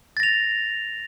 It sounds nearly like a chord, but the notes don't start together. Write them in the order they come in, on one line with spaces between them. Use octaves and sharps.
A6 A#6 F7